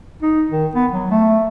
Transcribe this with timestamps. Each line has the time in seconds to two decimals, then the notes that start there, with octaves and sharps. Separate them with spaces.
0.22 D#4
0.51 D#3
0.75 B3
0.92 F#3
1.11 A3